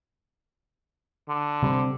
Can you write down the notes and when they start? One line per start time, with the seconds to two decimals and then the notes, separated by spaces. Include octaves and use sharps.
1.28 D3
1.63 C3 G3 C4